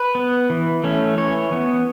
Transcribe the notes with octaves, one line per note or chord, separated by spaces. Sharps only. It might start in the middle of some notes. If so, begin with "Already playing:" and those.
Already playing: B4
B3
E3
A3 C#4
E3 C#5
B3